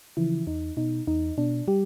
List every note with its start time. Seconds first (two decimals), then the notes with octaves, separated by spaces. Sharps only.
0.17 C#3 E3 F3 E4
0.47 E2 D#4
0.77 B2 D#4
1.07 E2 D#4
1.38 B2 D4
1.68 G3 G4